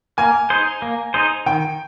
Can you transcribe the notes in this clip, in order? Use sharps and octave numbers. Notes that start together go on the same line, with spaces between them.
A#3 G#5
D#4 G#4 C5
A#3
D#4 G#4 C5
D#3 G5